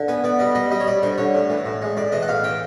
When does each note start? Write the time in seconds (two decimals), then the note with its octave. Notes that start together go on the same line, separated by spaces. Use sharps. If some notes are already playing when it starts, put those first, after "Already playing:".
Already playing: D3
0.08 B3 G#5
0.24 B3 D5
0.39 G3 D#5
0.55 G3 D#5
0.71 G3 D#5
0.80 C#5
0.87 G3 D5
1.03 D3 C5
1.18 D3 C#5
1.34 A2
1.50 E3
1.65 A2
1.82 G#3
1.97 A2 D5
2.12 E3 D#5
2.22 F#5
2.28 A2 F5
2.44 E3 G5